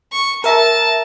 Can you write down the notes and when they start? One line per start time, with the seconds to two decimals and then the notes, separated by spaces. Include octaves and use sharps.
0.12 C#6
0.44 A#4 E5 A5 A#6